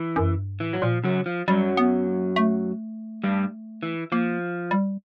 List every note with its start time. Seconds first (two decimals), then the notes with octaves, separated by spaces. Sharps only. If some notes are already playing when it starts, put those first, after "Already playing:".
Already playing: E3
0.16 F#2
0.38 G2
0.60 A2 E3
0.73 F#3
0.82 A#2 F3
1.04 F#2 C#3 F#3
1.26 F3
1.48 F#2 F#3 G3
1.77 B3
2.07 A#3
2.36 A3
3.24 G2 G3
3.83 E3
4.12 F3 A#3
4.71 G3